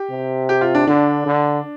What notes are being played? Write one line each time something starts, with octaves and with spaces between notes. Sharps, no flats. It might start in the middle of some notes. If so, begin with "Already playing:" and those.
Already playing: G4
C3
G4
F4
D4
D3 D4
D3